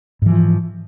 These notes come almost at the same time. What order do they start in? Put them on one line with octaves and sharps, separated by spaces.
G#2 E3 F3